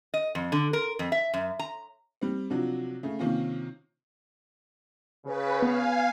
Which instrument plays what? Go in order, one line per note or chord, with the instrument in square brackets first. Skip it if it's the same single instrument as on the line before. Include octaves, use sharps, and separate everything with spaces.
[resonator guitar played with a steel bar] D#5
F2
D3
A#4
F2
E5
F#2
A#5
[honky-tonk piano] G3 C4
C3 F3 F#3 D4
C#3 A3
C3 D#3 A#3 C#4 F4
[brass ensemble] C#3 [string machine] B4
[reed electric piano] B3 [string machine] F5 G#5